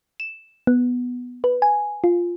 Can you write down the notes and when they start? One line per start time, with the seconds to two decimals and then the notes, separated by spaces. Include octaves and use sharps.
0.20 E7
0.67 B3
1.44 B4
1.62 G#5
2.04 F4